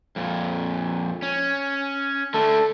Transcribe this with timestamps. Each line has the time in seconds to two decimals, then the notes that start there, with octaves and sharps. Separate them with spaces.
0.16 F2 A#2
1.22 C#4
2.34 D3 A3 A4